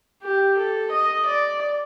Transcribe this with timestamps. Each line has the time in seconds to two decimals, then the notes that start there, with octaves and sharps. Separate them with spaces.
0.23 G4
0.57 A4
0.91 D#5
1.26 D5